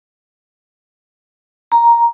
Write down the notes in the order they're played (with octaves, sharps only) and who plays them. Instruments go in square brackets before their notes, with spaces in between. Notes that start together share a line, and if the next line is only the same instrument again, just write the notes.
[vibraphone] A#5